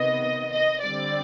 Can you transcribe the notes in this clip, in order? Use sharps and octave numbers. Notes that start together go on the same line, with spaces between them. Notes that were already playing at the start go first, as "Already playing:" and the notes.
Already playing: C3 D#3 B3 D#5
D#5
D3 G3 C4 D5